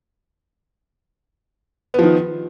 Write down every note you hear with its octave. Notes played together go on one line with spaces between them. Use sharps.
D#3 F3 B3